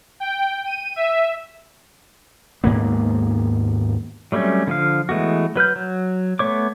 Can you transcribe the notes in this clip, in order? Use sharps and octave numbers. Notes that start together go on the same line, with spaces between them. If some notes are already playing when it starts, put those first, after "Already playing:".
G5
D#7
E5
D#2 G#2 A#3 B3
F#3 G3 A3 C4 C#4
D3 F3 F5
E3 G#3 A3 B3 F#4
F#3 B4 F6 G6
F#3
A3 B3 C#5 D6